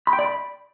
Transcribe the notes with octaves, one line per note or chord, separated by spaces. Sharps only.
B5
G5
D5
B5